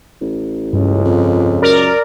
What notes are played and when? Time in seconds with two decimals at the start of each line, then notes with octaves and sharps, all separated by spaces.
0.21 A1
0.73 C#2 G2
1.05 F2
1.62 F#2 A#4 D5